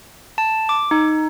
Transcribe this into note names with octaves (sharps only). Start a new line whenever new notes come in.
A5
D6
D#4